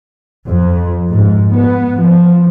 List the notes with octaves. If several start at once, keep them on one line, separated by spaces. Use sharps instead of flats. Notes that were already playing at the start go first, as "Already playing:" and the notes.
F2
G#2
B3
F3